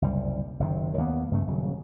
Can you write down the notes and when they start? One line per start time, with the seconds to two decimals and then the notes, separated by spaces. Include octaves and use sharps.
0.02 F#1 C2 G3
0.60 F#1 C3 D#3
0.97 D#2 A#3 B3
1.31 G2 C#3 A3
1.47 D#1 C#3 F#3